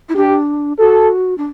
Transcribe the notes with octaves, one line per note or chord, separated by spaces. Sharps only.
E4
D4 G4
F#4 A4
D4